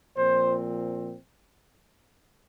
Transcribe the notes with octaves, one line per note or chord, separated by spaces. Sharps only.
A#2 F3 C4 C5